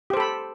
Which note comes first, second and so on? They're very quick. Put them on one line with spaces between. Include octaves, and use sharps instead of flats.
G4 C5 A4 B5